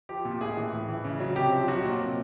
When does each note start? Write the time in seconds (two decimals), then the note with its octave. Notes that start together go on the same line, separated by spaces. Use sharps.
0.09 F3 G4
0.25 A#2
0.41 A2 G#4
0.57 E3
0.73 A2
0.88 E3
1.04 C#3
1.20 F#3
1.36 C3 G4
1.52 F3
1.68 F#3 F#4
1.84 A#2
2.00 C3